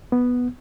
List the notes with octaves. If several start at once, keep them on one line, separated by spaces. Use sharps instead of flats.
B3